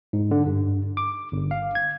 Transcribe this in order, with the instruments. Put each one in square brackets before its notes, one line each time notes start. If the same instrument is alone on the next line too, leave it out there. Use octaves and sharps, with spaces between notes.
[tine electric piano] G#2
D3
G2
D6
G1
F5
G#6